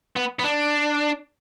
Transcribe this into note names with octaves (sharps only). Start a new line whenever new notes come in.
B3
B3
D4